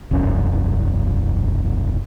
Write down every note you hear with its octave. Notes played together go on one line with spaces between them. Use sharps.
E1 C2 F#2 C#4